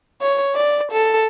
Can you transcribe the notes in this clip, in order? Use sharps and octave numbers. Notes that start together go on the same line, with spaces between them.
C#5
D5
A4